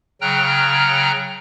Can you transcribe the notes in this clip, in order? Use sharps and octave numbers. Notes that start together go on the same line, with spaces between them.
C#3 F#3 G5 A#5 F6 F#6